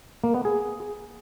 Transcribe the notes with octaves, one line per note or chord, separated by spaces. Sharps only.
A#3
B3
G#4